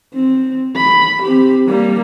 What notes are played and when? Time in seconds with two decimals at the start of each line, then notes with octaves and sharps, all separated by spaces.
0.14 C4
0.76 B5
1.22 C4 G4
1.68 G3 A#3